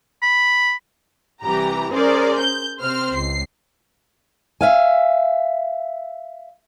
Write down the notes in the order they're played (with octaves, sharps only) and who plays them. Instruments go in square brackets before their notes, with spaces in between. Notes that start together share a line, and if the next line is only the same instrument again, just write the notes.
[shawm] B5
[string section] C2 E3 G4 A#5
C#4 G#4 A#4 C5 D5
G6
C3 C4 C5 F6
C#2 C7
[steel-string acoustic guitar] E5 F5 G#5